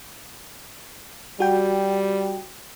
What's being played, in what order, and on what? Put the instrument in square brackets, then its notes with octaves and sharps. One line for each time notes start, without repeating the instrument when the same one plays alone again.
[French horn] G3 [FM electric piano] F#4 G5